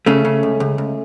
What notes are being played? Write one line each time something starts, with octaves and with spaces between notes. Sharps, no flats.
C#3 A3 C#4
C#3
C#2
C#2
C#2